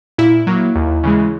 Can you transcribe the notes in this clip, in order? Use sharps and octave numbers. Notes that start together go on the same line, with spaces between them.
A#2 E4
F#3 A#3
D#2
C#3 E3 G#3